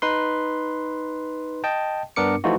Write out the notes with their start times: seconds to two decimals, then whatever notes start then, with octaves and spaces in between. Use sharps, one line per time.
0.02 D#4 B4 C6
1.64 D#5 G5 A5
2.16 G2 B3 D4 A#4 D6 C#7
2.44 E3 F3 A3 D#4 F4 F#4